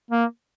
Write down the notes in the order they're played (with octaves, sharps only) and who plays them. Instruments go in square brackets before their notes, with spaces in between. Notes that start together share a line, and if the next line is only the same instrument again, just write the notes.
[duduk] A#3